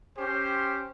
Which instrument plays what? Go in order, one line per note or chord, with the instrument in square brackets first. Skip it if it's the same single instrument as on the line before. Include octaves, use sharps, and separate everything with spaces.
[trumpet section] C#4 G4 C5